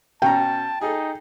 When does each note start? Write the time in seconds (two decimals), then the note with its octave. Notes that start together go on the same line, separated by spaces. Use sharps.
0.22 B2 C#4 G5 A5 A#5
0.81 D#4 G#4 A4